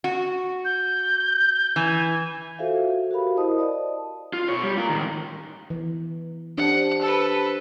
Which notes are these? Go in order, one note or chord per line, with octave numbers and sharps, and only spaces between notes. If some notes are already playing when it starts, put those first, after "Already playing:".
F#4
G6
E3 G#5
F4 F#4 A4 C5 E5 F5
F#4 G4 A#4 F5 B5
E4 A#4 C5 D#5 A5 D#6
D5 D#5 A5
F4
B2 C#5
G3
F4 A#4
A2 D#3
E3
D4 G4 C5 F#5 A5
A4 B4